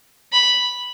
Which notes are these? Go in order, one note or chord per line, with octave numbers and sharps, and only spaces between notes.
B5